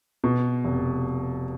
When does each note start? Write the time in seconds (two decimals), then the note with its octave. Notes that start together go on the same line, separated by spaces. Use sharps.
0.24 B2
0.65 F1